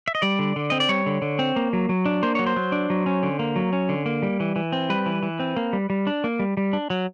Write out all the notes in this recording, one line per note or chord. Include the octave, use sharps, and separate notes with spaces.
E5
D#5
G3 D5
D3
D3
C4 D#5
D5
G3 C#5
D3
D3
C4
A#3
F#3
F#3
D4
A#3 C5
F#3 C#5
C5
F#3
D4
F#3
C#4
D3
A#3
F#3
C#4
D3
A#3
G3
E3
E3
C4
G3 B4
E3
E3
C4
A#3
G3
G3
D4
A#3
G3
G3
D4
F#3